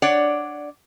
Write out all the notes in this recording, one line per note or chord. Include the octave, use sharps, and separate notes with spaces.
D4 C#5 D5 F#5